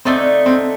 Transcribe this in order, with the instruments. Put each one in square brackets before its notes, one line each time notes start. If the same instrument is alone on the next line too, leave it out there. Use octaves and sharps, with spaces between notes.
[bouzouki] D3 A3 D#4 [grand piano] C4
[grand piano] C4